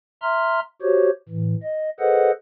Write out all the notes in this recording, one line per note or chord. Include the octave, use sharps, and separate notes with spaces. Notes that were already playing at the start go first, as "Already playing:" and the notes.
E5 A#5 C6 F6
F#4 G4 C5 C#5
A2 E3
D#5
G#4 A4 B4 C5 D#5 F#5